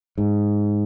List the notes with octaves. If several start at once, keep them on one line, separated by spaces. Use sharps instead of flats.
G#2